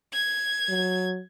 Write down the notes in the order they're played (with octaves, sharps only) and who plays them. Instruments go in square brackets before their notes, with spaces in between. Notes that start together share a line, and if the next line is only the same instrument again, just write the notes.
[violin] G#6
[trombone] F#3